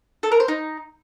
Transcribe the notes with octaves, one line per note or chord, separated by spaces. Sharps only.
A4
A#4
C5
D#4